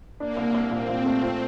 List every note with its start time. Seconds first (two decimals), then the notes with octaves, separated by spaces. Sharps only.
0.19 A#3 D4
0.37 C2
0.54 C2
0.71 A#2 C4
0.88 A#2
1.06 A3
1.23 F4